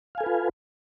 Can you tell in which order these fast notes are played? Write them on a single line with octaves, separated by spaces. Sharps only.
F5 G#5 A4 B4 F4